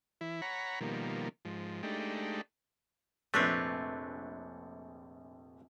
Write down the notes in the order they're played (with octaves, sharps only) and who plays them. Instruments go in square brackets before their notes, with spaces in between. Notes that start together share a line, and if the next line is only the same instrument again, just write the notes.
[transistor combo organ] E3 E4
C#5 F#5 A#5 B5
B2 D#3 F3 G3 A#3
G#2 F3
G#3 A3 D4 D#4 G4
[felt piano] F1 A#1 [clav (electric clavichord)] A3 C4 [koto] D4 B4 C#5